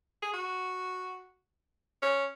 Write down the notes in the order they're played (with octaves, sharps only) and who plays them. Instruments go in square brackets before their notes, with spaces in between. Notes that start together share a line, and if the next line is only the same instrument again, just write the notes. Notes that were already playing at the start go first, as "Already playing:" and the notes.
[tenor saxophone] G#4
F#4
C#4